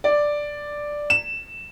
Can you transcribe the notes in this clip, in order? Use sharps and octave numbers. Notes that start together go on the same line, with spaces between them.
D5
E7